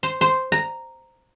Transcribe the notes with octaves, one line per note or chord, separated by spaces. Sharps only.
C5
C5
A#5